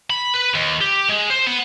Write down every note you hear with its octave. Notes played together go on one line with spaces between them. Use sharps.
B5
B4
D#2
G4
G#3
C5
B3